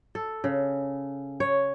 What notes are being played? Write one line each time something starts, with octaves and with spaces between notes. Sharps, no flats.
A4
C#3
C#5